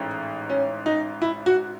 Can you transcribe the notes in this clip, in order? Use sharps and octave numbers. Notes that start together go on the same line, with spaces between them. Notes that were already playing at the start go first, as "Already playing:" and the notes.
Already playing: A1 G#2
C#4
D#4
E4
F#4